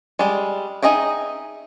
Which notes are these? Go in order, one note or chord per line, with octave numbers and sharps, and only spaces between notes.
G3 G#3
D#4 G#4 D#5 E5 G5